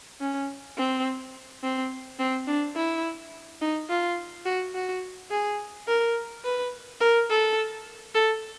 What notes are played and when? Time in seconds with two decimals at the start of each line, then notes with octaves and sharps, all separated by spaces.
0.21 C#4
0.77 C4
1.63 C4
2.19 C4
2.47 D4
2.76 E4
3.61 D#4
3.89 F4
4.45 F#4
4.75 F#4
5.31 G#4
5.88 A#4
6.44 B4
7.01 A#4
7.30 A4
8.15 A4